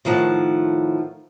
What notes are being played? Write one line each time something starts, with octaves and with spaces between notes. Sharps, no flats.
A2 D#3 F3 F#5